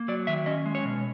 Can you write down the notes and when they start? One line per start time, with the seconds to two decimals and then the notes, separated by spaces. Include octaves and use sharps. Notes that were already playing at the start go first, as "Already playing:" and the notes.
Already playing: A#3
0.08 F#3 D5
0.27 D#3 E5
0.46 C#4 D#5
0.66 G#3
0.75 C#5
0.85 B2